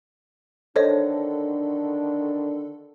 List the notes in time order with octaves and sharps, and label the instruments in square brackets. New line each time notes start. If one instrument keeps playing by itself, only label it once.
[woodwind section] D3 D#3 D4 [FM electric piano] A4 [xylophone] C5 C#5 D#5